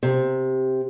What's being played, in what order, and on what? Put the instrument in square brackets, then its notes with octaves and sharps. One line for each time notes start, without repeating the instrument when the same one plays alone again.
[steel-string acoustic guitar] C3